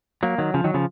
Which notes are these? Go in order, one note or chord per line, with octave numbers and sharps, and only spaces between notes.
F#3 A#3
D#3 F#3
C#3 F3
D#3 F#3
C#3 F3